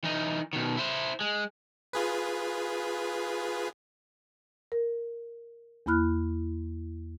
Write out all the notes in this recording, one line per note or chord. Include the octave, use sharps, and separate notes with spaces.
E3 D#4
B2 D#3
E4 C5
G#3
F4 G#4 B4
A#4
E2 A#3 E4 B5 F6 F#6